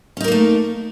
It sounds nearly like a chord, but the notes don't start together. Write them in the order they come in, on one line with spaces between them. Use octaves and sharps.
C#4 D#4 A#4 A#3 A3